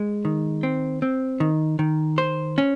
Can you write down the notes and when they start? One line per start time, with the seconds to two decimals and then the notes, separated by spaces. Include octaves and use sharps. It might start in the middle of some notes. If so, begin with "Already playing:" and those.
Already playing: G#3
0.25 D#3
0.63 C4
1.02 C4
1.40 D#3
1.79 D#3
2.18 C5
2.58 C#4